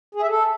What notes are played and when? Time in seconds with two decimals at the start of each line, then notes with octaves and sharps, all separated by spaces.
0.15 G#4
0.22 E5
0.29 A4